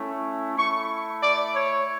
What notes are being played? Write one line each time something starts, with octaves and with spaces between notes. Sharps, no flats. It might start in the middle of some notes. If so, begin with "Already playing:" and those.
Already playing: A3 C#4 E4
A3 E4 C#6
D5
C#5